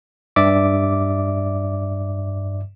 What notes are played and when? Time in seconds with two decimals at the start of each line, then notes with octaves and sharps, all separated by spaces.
0.36 G2 D5 E5 D6